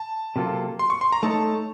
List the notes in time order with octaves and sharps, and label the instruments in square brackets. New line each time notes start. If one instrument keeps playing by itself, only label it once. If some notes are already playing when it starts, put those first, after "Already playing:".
Already playing: [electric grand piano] A5
[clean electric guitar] C3 F#3 A#3 F4 A4
[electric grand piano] C6
C#6
C6
A#5
[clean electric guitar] A3 D#4 A4 C#5 [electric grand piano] A5